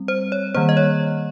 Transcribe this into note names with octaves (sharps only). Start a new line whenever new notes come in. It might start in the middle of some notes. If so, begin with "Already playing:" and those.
Already playing: G3 C4
C5
C#5
D#3 G3 A#3 C5
D#5
C#5